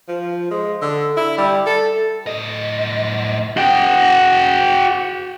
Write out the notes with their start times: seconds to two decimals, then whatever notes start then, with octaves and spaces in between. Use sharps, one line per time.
0.08 F3
0.51 G#3
0.81 D3
1.17 E4
1.38 G3
1.67 A4
2.27 A2 D#5
3.57 F#4 G5